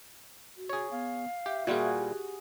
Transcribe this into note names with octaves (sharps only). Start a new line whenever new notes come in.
F#4
G#4 C#5
B3 F5
G4 E5
A#2 G3 F4 F#4 G#4
G4